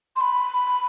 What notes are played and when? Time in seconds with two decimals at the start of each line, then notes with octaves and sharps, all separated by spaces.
0.16 C6
0.21 B5